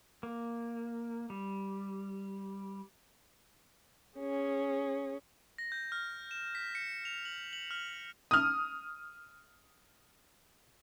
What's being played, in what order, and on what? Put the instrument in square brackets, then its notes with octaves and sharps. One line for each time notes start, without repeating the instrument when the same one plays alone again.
[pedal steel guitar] A#3
G3
[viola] C#4 G#4
[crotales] A#6
G6
F6
E7
B6
C#7
F7
F#7
F#7
F6
[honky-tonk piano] D#6 F6